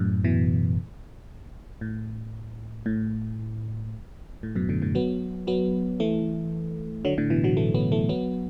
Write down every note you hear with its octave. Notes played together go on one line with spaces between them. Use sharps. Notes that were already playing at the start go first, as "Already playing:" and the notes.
Already playing: F#2 A2
B2 E3
A2
A2
A2
F#2 B2
A2 D3
A2 D3
F#3 B3
F#3 B3
E3 A3
D3 F#3
A2 D3
B2 E3
D3 F#3
E3 A3
F#3 B3
E3 A3
F#3 B3